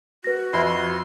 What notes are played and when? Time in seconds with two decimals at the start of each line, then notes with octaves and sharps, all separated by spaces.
0.24 F#4 B4 A#6
0.53 F2 E4 C6
0.66 C6